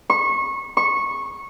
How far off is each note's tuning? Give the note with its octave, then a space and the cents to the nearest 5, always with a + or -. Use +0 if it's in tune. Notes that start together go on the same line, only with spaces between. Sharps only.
C#6 -25
C#6 -15